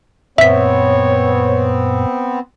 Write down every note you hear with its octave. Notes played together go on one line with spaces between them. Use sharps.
F#2 A#2 B3 C4 C#5 E5 B6